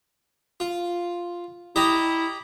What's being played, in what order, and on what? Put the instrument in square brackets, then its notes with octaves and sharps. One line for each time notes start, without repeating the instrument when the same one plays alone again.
[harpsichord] F4
[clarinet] E4 [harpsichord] G4 D#5 A#5